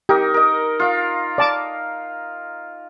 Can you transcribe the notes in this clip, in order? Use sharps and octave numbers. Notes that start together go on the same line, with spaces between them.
D#4 G4 A#4
A#4 D#5
F4 F5
D5 A5 D6